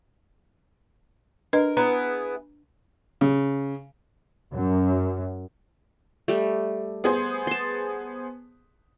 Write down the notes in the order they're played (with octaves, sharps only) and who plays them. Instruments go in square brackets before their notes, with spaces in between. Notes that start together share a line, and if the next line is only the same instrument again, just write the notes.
[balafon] D4 B4 D#5 [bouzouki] A#4
[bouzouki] B3 E4 G#4 [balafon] A#5
[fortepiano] C#3
[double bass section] F#2
[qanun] G3 A3
[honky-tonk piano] B3 G#4 C5
[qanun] A5 C6